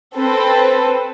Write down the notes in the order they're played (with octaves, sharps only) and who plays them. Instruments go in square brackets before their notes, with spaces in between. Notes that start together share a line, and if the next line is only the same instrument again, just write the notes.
[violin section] C4 A4 B4